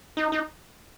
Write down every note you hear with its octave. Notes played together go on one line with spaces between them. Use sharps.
D#4
D#4